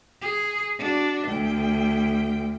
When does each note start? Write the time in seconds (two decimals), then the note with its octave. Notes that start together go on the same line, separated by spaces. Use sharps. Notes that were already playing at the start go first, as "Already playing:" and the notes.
0.21 G#4
0.79 D4 F#4
1.27 D2 G5